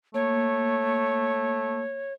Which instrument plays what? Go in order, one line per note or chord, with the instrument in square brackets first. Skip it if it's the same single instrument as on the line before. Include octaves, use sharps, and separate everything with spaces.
[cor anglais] A3 [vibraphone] A#3 [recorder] C#5